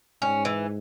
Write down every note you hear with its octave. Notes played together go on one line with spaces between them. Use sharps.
G#2 C#4
E3